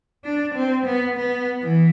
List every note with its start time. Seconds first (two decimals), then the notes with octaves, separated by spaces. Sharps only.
0.24 D4
0.54 C4
0.86 B3
1.16 B3
1.62 E3